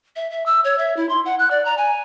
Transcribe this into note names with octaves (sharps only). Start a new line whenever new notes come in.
E5
E5
E6
C#5
E5
E4
C6
F#5
F#6
D5
A#5
G#5